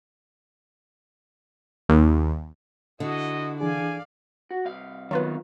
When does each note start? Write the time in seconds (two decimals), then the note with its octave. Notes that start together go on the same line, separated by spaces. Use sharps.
1.89 D#2
3.00 D3 E4 F#4 D#5
3.60 E3 D4 G#4 D5 F5 G#5
4.51 F#4
4.65 C2 F5
5.11 D#3 F#3 B3 F4 B4